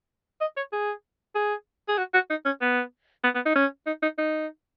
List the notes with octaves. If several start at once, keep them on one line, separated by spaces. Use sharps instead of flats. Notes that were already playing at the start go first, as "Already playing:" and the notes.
D#5
C#5
G#4
G#4
G#4
F#4
F#4
D#4
C#4
B3
B3
B3
D#4
C#4
D#4
D#4
D#4